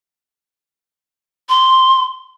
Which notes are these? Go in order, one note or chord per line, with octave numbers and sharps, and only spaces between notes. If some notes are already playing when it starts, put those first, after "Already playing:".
C6